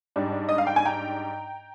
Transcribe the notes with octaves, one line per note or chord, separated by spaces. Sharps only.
G#2 G3 D4
D#5
F5
G5
G#5
G5 A#5